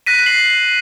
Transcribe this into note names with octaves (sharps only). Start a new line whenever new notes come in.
F#6 A#6 B6 D#7
C7 F#7